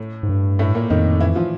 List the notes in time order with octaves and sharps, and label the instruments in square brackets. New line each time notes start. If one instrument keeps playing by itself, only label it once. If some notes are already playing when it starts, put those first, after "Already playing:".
Already playing: [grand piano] A2 A3
[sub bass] G#2
G2
[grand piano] A2 A3
A#2 A#3
[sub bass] F2 [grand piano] D#3 D#4
[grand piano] E3 E4
F3 F4